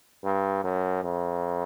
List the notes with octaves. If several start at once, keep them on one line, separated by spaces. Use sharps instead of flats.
G2
F#2
F2